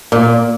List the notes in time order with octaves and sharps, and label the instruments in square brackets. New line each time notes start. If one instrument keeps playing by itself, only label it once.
[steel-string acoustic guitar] A#2